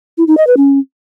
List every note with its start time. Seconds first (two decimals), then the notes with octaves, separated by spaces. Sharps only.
0.18 E4
0.28 D#4
0.37 D#5
0.47 B4
0.57 C#4